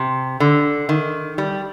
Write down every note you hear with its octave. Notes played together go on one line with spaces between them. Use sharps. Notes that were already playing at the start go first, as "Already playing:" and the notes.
Already playing: C3
D3
D#3
G3